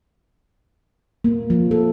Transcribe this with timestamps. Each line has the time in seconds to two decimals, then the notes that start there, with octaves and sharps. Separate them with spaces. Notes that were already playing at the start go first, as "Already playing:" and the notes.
1.24 A#3
1.50 F3
1.71 A4